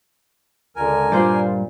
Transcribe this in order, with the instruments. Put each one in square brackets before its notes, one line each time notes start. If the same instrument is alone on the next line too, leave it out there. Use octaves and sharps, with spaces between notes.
[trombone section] C#2 D3 [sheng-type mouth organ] A#4 G#5
[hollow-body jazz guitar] G2 [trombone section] A#2 [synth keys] F4 C5 D5